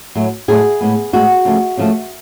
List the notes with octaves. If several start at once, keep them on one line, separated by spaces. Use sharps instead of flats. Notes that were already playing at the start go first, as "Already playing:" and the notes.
A2 F#3 A3
A2 F#3 A3 G#4
A2 G#3 B3
A2 G#3 B3 F#4
C#3 F3 A3
C#3 F3 A3